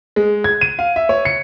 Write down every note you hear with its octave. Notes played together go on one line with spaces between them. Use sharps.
G#3
G#6
D#7
F5
E5
C#5
C#7